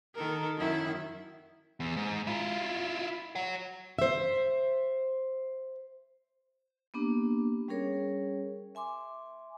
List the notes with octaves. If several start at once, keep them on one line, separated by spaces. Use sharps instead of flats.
D#3 A4 A#4
F#2 D#3 E4
E2
G#2
E4 F4
C#5 F#5
C5 E5
A#3 B3 D4 G4
G3 C#4 G#4 A#4 C#5
E5 G#5 C6 D6